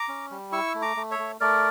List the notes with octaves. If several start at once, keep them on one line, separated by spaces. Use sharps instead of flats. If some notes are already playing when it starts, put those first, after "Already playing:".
Already playing: A#5 D6
C#4
G3
E4 C#6 E6
A3
A#5 D6
A3
C#5 E5
A3
A3 A#4 D5